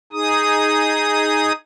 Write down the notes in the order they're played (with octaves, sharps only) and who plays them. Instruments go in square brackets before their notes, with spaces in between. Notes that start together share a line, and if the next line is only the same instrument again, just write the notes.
[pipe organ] D#4 G#4 D#6